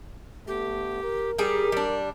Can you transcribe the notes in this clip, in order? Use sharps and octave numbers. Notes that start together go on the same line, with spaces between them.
D3 A3 B3 G4
A#4
G3 G4 G#4
G3 D4